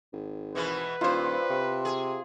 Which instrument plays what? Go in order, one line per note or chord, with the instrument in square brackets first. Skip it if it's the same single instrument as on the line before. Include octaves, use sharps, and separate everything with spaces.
[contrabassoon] G#1
[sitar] B2 E3 G#3 [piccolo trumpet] B4
[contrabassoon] D#1 [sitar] G2 C5 [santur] F4
[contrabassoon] C3
[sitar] G#4